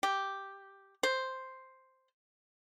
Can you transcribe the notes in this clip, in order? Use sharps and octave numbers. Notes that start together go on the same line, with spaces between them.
G4
C5